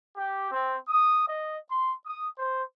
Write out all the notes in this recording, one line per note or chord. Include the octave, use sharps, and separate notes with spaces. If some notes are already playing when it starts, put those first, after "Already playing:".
G4
C4
D#6
D#5
C6
D#6
C5